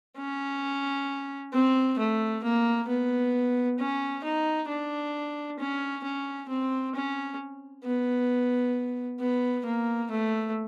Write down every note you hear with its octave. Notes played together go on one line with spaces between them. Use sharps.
C#4
C4
A3
A#3
B3
C#4
D#4
D4
C#4
C#4
C4
C#4
B3
B3
A#3
A3